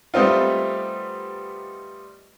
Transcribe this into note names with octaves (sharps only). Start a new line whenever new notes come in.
G3 A3 B3 C4 D#4 F4